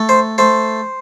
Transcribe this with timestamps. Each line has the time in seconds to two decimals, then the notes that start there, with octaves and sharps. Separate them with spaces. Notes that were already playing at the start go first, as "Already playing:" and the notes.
Already playing: A3
0.09 C5
0.38 A3 C5